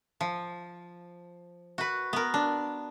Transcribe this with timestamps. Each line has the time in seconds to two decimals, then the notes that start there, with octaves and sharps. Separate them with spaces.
0.21 F3
1.78 F#4 B4
2.13 B3 A#4
2.34 D4